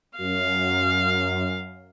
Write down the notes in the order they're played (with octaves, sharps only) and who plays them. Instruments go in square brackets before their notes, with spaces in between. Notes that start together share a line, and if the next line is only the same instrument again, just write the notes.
[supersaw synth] F#2 [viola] F5